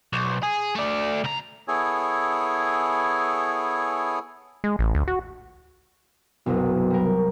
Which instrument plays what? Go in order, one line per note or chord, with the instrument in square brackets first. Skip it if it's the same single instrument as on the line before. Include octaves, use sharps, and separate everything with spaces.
[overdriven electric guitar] B1
G#4
A3 D5
C#2 A#5
[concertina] B3 E4 G#4 A4 C#5 G#5
[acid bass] G#3
A1
D2
F#4
[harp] F#1 C2 F#3 [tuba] B2
[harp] G3 A#4